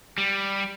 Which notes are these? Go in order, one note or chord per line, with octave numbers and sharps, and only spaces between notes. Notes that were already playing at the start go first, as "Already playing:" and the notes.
G3